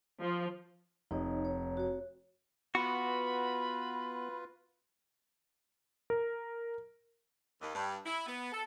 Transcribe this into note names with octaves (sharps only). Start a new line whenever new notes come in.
F3
F1 D#4 C#5 D#5
C#5
F#4 C#5
B3 F4 F#4 B4 B5
A#4
D#2
G2
E4
B3
A4